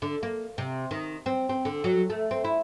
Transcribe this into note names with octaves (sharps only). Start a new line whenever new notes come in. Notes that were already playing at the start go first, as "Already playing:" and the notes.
D3
A#3
C3
D#3
C4
C4
D3
F#3
A3
C4
E4